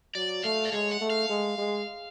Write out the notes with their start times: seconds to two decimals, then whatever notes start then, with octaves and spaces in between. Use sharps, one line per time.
0.15 F#3 D5
0.43 A3 F5
0.65 D5
0.72 G#3 C#5
0.91 F#5
1.01 A3
1.10 F5
1.29 G#3
1.58 G#3